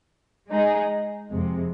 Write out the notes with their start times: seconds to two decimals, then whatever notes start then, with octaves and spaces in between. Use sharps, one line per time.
0.49 G#3 D#4 G#4
1.30 F2 C3 G#3